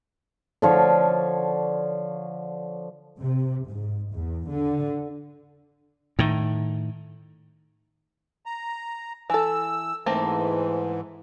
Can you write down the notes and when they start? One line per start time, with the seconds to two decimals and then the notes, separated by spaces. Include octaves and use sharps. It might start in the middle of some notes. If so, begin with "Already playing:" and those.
0.62 D3 F3 C#5
3.18 C3
3.68 G#2
4.12 E2
4.49 D3
6.19 A2 D#3
8.46 A#5
9.30 E3 A4 E6
10.06 G#2 E3 A3 A#3 C4